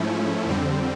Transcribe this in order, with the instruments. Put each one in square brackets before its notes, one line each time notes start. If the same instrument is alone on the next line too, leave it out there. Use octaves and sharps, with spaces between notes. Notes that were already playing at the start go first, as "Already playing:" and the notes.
Already playing: [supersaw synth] G#2 F3 A3 C#4 E4
F2 D3 G3 C4